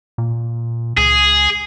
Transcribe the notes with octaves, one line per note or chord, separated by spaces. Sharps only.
A#2
C#2 G#4